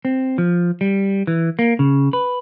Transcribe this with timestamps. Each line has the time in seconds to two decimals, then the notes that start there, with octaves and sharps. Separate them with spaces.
0.05 C4
0.38 F3
0.81 G3
1.27 E3
1.59 A#3
1.79 C#3
2.13 B4